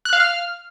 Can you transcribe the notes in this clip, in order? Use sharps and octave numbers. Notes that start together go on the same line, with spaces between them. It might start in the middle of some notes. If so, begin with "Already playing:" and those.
F#6
F5
F6